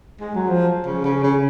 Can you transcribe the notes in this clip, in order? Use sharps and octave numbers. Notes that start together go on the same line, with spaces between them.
G#3
F#3
F3
C#3
C#3
C#3